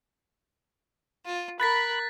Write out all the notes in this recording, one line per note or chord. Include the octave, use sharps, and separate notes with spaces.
F4
A#4 B5 F#6 A6 B6